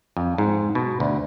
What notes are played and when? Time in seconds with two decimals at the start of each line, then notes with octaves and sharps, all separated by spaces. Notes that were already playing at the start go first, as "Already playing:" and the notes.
0.17 F2
0.38 G#2
0.75 B2
1.00 D2